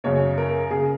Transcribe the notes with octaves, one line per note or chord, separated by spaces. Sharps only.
F#2 C#3 C#5
A#4
C#3 G#4